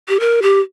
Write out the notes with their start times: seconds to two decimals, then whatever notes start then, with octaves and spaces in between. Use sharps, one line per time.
0.09 G4
0.20 A#4
0.42 G4